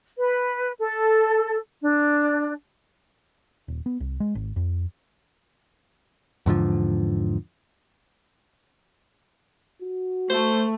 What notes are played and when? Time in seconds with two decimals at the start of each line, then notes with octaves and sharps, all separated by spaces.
0.18 B4
0.79 A4
1.82 D4
3.68 D#1
3.86 B3
4.00 C2
4.20 G#3
4.35 G#1
4.56 F2
6.46 E2 G#2 D3 F3
9.82 F#4
10.30 A3 C5